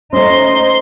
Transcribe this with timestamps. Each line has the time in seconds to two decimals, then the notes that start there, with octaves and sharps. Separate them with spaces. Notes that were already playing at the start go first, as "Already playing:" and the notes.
0.13 A3 C#4 D#4 C5 C6